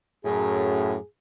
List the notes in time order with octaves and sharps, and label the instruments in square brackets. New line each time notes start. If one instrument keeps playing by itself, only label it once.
[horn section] F#2 A2 [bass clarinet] G#4